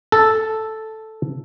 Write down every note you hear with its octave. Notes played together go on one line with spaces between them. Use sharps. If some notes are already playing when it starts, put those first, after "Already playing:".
A4